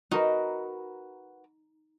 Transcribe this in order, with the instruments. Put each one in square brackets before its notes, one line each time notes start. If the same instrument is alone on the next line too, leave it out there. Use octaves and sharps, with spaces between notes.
[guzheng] D#4 [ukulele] F#4 A#4 B4